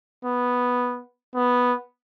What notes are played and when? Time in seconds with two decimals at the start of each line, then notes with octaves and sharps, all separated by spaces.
0.25 B3
1.36 B3